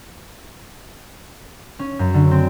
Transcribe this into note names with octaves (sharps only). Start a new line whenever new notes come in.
C#4
F#2
D3
C4